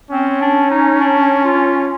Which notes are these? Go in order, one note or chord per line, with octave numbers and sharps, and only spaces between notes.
C4 C#4
D4
D#4
D4
F4